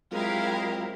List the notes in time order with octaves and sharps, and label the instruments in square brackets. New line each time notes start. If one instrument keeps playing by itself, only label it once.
[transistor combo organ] F#3 C4 F4 [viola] G#3 F5 [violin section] E4 G4 A#4